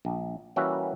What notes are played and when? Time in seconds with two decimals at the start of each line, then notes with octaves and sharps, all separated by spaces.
0.05 A#1
0.56 E3 G3 A#3 C#4 F#4 E5